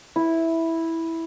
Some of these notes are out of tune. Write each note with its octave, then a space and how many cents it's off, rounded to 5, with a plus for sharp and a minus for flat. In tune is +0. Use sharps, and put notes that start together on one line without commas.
E4 -5